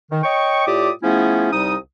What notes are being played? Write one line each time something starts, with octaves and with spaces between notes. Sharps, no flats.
D#3
C#5 D#5 G5 C#6
A2 F4 G4 D5 D6 D#6
F3 A3 B3 C#4 E4 G#4
C2 G3 D#4 D#6